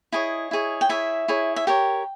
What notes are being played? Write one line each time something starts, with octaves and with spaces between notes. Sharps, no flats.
E4 G#4 C#5 D#5
E4 G#4 C#5
G5
E4 G#4 C#5 E5
E4 G#4 C#5
E5
G4 A#4 C#5 G5